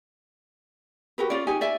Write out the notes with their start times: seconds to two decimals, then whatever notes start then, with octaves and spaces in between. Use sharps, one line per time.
1.18 F#4 G4 A#4 B4
1.30 C#4 F4 D5
1.47 D#4 G4 G#5
1.61 D5 E5 G#5